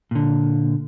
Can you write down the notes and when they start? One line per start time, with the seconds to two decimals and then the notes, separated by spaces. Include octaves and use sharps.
0.11 A#2 D3